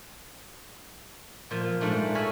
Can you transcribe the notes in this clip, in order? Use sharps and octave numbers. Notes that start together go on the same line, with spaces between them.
A#2 F3
G#2 G#3 A3 D4
A4 A#4 C#5 E5 G#5 B5